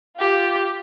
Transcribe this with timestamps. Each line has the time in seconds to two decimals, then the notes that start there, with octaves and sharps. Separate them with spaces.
0.17 F4 G4